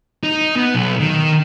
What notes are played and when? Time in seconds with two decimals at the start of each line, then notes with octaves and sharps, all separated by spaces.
0.24 D#4
0.56 B3
0.75 B1
1.00 D#3